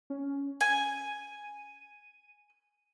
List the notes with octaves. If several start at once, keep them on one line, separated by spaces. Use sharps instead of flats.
C#4
G#5 D#7